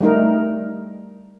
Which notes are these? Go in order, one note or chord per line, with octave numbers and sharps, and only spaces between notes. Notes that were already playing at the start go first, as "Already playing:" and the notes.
G3 A3 D#4 A#4